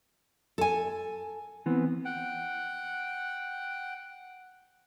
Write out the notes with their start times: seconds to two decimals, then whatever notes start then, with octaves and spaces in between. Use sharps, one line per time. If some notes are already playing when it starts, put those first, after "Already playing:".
0.58 A4 G#5
1.66 E3 B3 C4
2.05 F#5 G5